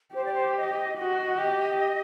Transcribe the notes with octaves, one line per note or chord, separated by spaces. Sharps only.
G4 C5
D5
C5
D#5
F#4 D#5
G4